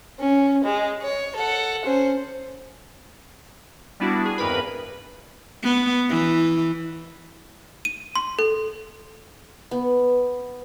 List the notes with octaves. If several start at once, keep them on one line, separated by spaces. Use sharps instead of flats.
C#4
G#3
C#5
A4 F#5
C#4 C5
G3 B3 D4 E4 F#4
G#4
G#1 E2 G2 A#4 B4 B5
B3
E3
D#7
C6
A4
B3